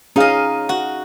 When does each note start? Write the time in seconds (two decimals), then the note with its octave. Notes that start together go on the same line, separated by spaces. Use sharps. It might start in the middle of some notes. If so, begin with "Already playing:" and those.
0.16 C#4 D#4 G#4 D#5 F5
0.69 F#4